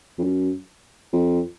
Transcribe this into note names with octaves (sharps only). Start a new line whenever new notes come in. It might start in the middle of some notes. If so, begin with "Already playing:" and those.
F2
F#2
F2